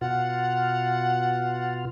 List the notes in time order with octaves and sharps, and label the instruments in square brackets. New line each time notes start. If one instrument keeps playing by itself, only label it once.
[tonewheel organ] B2 F4 [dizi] F#5